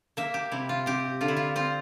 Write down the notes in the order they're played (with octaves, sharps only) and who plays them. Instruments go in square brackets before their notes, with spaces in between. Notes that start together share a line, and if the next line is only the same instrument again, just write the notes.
[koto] A#3 E5
G4
C3 E4
F4
C4 G4
D3 F4
E4
F4
C4 F4